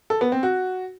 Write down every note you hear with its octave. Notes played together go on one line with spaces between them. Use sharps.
A4
B3
C4
F#4